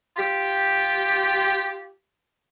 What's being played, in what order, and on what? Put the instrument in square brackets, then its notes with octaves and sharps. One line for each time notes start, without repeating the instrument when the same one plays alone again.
[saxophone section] F4 G4